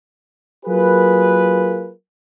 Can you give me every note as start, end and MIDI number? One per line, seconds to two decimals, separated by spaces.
0.66 1.91 54
0.66 1.91 58
0.66 1.91 65
0.66 1.91 68
0.66 1.91 70
0.66 1.91 71